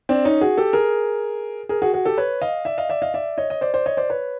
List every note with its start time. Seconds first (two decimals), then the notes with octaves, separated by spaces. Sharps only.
0.09 C4 D4
0.25 C#4 D#4
0.41 F#4 G#4
0.57 G4 A4
0.73 G#4 A#4
1.69 G#4 A#4
1.82 F#4 G#4
1.93 F#4 G#4
2.05 G4 A4
2.18 B4 C#5
2.41 D#5 F5
2.65 D5 E5
2.78 D#5 F5
2.90 D5 E5
3.02 D#5 F5
3.14 D5 E5
3.37 C#5 D#5
3.50 D#5
3.61 C5 D5
3.74 C5 D5
3.86 C#5 D#5
3.97 C5 D5
4.10 B4 C#5